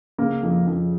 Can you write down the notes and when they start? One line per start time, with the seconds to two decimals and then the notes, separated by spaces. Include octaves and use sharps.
0.18 C#3 A#3
0.43 F2
0.67 F2